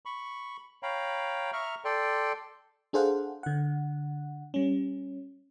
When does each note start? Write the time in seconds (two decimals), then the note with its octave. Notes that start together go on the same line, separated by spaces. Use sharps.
0.05 B5 C#6
0.83 C#5 F5 G5 A#5 B5
1.53 E5 A#5 C#6 F6
1.85 A4 D5 G5 C6
2.93 D4 G#4 A4 C5 F5 F#5
3.43 D3 F#5
4.54 G3 C#4